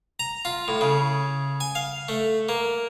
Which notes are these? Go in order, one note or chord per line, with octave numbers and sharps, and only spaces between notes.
A#5
F4
A2
C#3
G#5
F5
A3
A#3